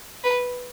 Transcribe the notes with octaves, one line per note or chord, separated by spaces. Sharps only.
B4